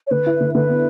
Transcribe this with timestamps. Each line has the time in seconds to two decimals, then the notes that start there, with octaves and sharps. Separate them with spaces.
0.07 C#5
0.11 D3 B4
0.26 E4
0.41 D3
0.55 D3 B4
0.69 B3